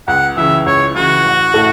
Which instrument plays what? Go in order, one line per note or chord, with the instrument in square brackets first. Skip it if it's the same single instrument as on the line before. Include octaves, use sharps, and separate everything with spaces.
[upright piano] C#2 [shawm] F#5
[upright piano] C#3 E3 [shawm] E5
[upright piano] C#2 [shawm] C#5
[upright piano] C#3 E3 [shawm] F#4
[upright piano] A1
A2 A3 E4 A4